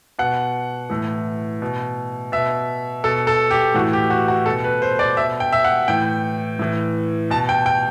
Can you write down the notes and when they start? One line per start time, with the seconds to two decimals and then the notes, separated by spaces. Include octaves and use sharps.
0.19 B2 F#5
0.90 A2 E3
1.62 B2
2.32 B2 E5
3.04 B2 A4
3.27 A4
3.51 G4
3.74 A2 E3 F#4
3.93 G4
4.10 F#4
4.28 F#4
4.46 B2 A4
4.64 B4
4.82 C5
4.99 D5
5.17 B2 E5
5.40 G5
5.53 E5
5.64 F#5
5.88 A2 E3 G5
6.59 A2 E3
7.30 B2 A5
7.49 G5
7.66 G5